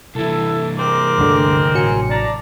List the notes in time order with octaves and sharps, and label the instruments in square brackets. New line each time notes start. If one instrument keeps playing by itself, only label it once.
[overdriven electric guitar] C2 E3 [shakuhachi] E4 [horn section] A4
[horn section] G#3 C4 A#4 [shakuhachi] D6
[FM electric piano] G1 D2 D3
[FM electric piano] A1 F#3 C#7 [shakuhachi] G#5
[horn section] D4 A#5 [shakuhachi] D5